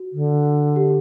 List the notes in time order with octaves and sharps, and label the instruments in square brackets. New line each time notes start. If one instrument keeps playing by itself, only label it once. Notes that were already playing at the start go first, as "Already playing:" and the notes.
Already playing: [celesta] F#4
[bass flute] D3
[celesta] G4